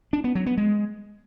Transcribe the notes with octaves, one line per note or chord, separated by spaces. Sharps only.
D4
B3
F#3
B3
G#3